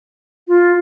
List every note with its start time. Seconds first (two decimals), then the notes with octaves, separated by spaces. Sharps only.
0.48 F4